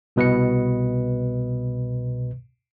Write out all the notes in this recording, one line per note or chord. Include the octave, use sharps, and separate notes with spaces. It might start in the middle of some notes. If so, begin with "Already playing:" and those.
C2 B2 B4 D#5 C#7